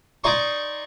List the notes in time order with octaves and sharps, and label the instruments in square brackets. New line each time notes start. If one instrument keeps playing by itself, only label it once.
[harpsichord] D#4 D5 G#5 C6 C#6